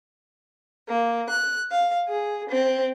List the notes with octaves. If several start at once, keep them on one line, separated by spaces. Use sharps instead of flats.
A#3
F#6
F5
G#4
C4